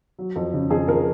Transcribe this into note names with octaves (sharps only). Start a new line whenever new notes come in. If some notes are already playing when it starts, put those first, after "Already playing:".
F#3
F2
C#3
F2 G#4
F2 A#4